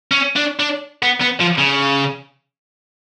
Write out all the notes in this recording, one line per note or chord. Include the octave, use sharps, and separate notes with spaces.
C#4
D4
D4
B3
B3
F3
C#3